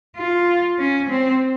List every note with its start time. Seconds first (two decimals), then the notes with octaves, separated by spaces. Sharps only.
0.17 F4
0.79 C#4
1.10 C4